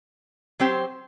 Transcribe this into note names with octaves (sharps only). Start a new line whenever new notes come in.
F#3 C4 G4 C5